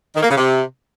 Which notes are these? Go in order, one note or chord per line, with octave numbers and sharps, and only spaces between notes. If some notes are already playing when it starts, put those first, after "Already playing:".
D#3
A#3
C#3
C3